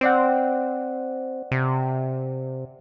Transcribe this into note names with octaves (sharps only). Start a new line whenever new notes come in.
C4 C5 D5 F#5
C3